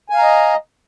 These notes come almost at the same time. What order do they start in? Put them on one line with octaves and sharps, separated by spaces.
G#5 F5 A#5 D#5